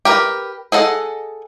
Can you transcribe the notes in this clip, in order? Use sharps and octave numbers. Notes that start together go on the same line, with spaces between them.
G4 A#4 B4
G#4 A4 D#5 F#5